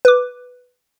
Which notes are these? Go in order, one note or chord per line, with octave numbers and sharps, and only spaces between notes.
B4 D6